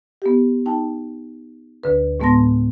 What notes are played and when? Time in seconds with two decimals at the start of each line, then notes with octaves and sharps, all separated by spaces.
0.22 B3 G4
0.66 D#4 G5 A5
1.84 D2 D3 B4
2.20 A2 G#3 B3 A5 C6 A#6